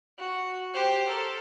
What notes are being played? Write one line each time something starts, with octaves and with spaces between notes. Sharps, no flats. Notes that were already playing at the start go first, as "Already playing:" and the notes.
F#4
G4 C5
A4 A#4